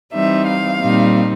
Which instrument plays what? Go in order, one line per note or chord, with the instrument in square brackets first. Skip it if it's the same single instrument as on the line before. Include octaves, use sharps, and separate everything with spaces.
[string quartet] E3 G3 C4 D#4 E5
F5
A#2 G3 C4 D#4